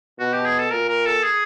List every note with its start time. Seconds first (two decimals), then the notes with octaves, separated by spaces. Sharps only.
0.20 B2 F#4
0.33 G4
0.45 G#4
0.59 A4
0.71 A#2 A#4
0.89 A#4
1.06 A4
1.23 G#4